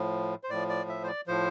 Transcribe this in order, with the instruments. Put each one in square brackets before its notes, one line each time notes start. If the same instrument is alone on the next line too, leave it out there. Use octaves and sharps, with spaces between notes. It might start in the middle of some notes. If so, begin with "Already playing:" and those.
Already playing: [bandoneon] A2 F3
C5
A2 F3 D5
D5
E5
C5
D5
A2 F3 C5